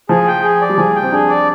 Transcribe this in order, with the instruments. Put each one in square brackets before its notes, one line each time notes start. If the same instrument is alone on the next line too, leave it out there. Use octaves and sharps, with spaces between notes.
[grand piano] F3 [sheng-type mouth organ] G#4
[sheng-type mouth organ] G5
G#4
D5
[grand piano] G3
[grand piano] F3 [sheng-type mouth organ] G#4
[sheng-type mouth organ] G5
[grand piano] C4
[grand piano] D4 [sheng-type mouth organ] G#4
[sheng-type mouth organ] D5